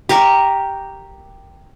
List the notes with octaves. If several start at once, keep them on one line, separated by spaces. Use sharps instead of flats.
G4 A#4 C#6